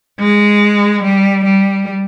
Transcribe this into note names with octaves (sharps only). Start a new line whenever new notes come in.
G#3
G3
G3